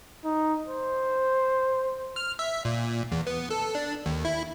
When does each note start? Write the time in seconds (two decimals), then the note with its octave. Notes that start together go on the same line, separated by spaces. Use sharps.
0.25 D#4
0.68 C5
2.16 F6
2.39 E5
2.65 A#2
3.12 E2
3.27 B3
3.50 A4
3.75 D4
4.06 D#2
4.25 E4